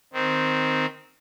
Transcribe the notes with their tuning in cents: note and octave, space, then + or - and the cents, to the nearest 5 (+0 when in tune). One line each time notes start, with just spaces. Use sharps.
D#3 +0 C4 -10